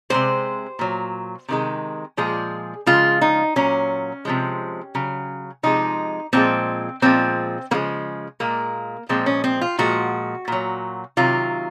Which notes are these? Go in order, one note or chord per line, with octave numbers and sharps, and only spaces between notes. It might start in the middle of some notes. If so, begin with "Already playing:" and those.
C3 D#3 G#3 C5
A#2 F#3
C3 D#3 G#3
A#2 F3 G#3 G#4
C#3 F3 G#3 F4
D#4
A#2 F#3 C#4
C3 F3 G#3
C#3 F#3
C3 F3 G#3 D#4
A#2 F3 G#3 C4
A#2 F3 G#3 C4
C#3 F3 G#3 A#3
A#2 G#3 A#3
A#2 F3 G#3 C4
C#4
C4
F4
A#2 F3 G#3 F#4
A#2 F#3
C3 D#3 F#3 F4